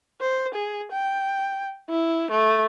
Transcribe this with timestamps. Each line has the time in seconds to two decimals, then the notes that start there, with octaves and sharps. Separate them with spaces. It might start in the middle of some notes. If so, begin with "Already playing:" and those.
0.21 C5
0.54 G#4
0.92 G5
1.89 E4
2.31 A3